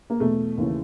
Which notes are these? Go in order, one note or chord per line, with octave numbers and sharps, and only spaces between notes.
A#3
E2 B2 A3
D#2 C#3 E3